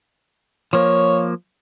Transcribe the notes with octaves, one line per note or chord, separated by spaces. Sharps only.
F3 A#3 C#5